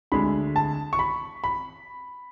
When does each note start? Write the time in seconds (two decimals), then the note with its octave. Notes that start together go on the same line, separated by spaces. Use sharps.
0.12 D2 D3 G#3 B5
0.56 A5
0.93 C#6
0.99 B5
1.44 B5